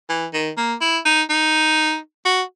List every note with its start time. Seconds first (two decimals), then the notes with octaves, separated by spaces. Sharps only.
0.09 E3
0.33 D#3
0.57 A#3
0.81 E4
1.05 D#4
1.29 D#4
2.25 F#4